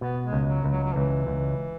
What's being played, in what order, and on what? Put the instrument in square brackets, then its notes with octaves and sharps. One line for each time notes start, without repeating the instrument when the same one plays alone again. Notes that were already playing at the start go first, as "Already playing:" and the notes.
[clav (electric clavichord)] B2 [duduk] B3
[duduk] G#3
[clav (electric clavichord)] C#2
[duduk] F#3
[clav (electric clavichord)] C#2
[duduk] F#3
F#3
[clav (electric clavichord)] C#2 [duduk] E3
[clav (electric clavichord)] C#2